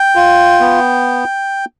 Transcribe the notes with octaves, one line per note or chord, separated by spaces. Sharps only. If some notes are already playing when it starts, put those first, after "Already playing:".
Already playing: G5
F4
B3